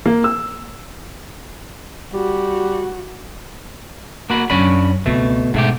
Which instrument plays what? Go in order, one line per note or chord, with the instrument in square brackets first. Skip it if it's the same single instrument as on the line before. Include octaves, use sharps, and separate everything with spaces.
[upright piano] A#3
E6
[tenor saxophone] G3 [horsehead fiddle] F#4
[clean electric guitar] A#3 F#4 B5
[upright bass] F#2 [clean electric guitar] C#4 D4 B5
[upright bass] C#2 C4 [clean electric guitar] B2 A3
[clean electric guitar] G#2 A3 G4 [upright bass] B2